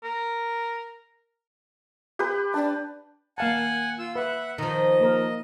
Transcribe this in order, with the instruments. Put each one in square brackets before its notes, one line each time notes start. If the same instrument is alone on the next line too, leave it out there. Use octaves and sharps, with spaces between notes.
[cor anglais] A#4
[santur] G4 B4
[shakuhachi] D4 [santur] A5
[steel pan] A#3 F5 A5 [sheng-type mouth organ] F#5 G#5
[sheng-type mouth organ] F4 E6
[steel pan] B4 [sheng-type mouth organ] E5 F#5
[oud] D#3 F3 [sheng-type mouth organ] D#5
[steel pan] A#3 A#4